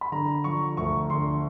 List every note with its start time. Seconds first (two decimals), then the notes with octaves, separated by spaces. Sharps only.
0.01 B5
0.12 D3 A#5
0.44 F3 C#6
0.77 D2 C#6
1.10 D3 C6